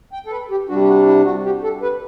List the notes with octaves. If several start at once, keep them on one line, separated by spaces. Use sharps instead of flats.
G5
A4
B4
G4
C3 G3 D4 F#4
G4
F#4
E4
F#4
G4
A4
B4